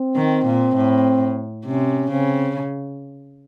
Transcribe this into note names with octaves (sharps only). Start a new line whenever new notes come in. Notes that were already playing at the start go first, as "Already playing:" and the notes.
Already playing: C4
D#3
A#2
A2
C3 C#4
C#3 C4